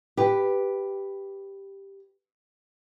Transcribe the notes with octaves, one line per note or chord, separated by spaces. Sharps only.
G4 B4